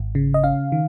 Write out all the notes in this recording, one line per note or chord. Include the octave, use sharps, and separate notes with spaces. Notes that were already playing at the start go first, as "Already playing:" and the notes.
Already playing: G#1
C#3
D#5
C#4 F5
D#3